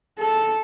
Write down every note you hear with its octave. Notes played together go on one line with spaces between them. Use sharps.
A4